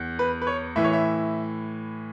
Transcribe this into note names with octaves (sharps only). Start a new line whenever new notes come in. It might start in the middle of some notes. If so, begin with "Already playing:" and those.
Already playing: E2
B4
B4
C#5
A2 E3 E5
C#5
E5